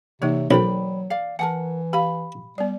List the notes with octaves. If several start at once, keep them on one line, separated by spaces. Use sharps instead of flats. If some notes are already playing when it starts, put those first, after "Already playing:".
C3 E3 A#3 D#4 C#5
B1 F#3 A#4 C5 D5 G5 B5
D5 F5
E3 A#4 F#5 G#5 A5
G4 F5 B5
G3 B3 D5